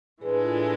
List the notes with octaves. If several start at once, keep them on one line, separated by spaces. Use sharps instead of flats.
A2 E3 G#3 D4 G#4 B4
F4 A4